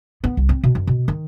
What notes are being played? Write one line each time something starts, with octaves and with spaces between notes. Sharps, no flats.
B3
C2
C4
B2
F#2
B2
D#3